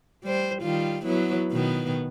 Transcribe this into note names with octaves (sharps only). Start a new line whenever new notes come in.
G3 C5
D#3 G3 F4
F#3 B3 E4
B2 D#3 B3